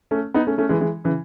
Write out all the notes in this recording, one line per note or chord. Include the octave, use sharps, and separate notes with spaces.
A3 C#4
B3 D#4
A3 C#4
A3 C#4
E3 G#3
E3 G#3
C#3 E3